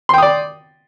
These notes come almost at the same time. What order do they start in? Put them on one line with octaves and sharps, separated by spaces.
C6 G5 D#6 D5